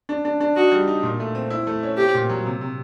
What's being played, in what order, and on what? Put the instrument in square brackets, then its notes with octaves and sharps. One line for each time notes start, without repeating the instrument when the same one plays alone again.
[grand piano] D4
D4
D4
[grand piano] D#4 [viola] F#4
[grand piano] G3
D#4
A#2
A3
C4
E4
A3
C#4
[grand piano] C4 [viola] G4
[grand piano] A#2
F#3
C3
C3